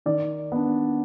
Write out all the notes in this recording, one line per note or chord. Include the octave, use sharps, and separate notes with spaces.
D#3 D5
B3 D4